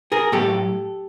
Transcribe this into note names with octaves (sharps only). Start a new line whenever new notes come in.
G#4 A#4
A2 F#3 G4 A4